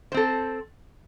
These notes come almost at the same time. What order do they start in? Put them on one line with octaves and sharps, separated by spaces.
C5 C4 A4